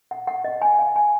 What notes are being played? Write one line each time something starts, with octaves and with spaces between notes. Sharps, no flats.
F#5
F#5
D#5
G#5
F5
G#5